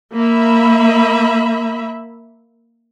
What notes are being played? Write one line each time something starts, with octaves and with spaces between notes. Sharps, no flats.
A#3 E5 B5